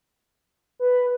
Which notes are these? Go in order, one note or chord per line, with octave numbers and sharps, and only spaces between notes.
B4